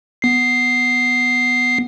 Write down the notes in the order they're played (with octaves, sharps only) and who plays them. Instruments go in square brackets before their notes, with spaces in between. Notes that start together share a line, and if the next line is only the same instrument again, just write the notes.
[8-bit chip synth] B3 C7